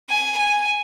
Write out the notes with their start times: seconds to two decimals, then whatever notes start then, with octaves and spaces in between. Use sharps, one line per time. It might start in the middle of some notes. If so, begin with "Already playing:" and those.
0.10 G#5
0.37 G#5